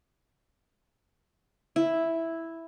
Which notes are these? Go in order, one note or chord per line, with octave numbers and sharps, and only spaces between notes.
E4